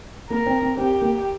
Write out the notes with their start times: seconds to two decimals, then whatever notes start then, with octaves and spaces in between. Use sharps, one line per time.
0.30 A#3 A#4
0.46 C4
0.62 C4
0.77 C4 G4
1.02 A#3